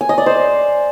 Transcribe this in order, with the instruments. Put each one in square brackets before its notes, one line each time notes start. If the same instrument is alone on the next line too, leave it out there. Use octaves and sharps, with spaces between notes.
[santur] G#5
D#5
D5
C5